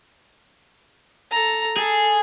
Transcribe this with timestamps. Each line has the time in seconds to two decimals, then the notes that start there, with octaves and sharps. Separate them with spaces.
1.31 A4 A#5
1.77 G#4 A4